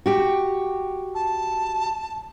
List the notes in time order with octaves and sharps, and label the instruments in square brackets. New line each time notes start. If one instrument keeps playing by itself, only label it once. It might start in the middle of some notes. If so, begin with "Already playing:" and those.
[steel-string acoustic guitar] F#4 G4
[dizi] A5